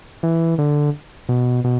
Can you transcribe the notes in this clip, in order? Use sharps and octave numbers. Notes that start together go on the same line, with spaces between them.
E3
D3
B2
B2